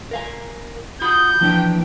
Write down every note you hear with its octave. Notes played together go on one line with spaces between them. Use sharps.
A#4 F5 G#5
F4 F#4 B5 D#6 G6
E3 F3 A#3 D4 G5